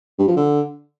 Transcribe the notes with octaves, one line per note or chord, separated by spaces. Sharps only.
G2
F3
D3